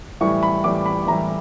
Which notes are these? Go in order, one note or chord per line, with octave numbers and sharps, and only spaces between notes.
A2 E3 G3 C#6
B5
A2 E3 G3 D6
B5
A2 E3 G3 A#5